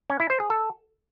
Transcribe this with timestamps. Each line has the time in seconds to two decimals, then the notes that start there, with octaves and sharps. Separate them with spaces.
0.10 C#4
0.20 E4
0.30 C5
0.40 G#4
0.50 A4